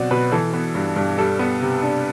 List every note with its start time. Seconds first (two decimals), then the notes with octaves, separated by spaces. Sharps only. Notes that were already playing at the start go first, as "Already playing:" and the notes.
Already playing: B2 F#3 C4 D5 F#5
0.11 B2 B4
0.32 E3 A4
0.53 B3
0.75 G2
0.96 G2
1.18 G3 A4
1.39 B3
1.61 C3
1.82 D4